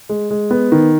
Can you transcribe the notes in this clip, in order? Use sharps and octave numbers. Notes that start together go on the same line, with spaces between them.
G#3
G#3
B3
D#3